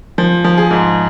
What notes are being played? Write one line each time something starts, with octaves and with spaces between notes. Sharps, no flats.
F3
F3
G#4
G#2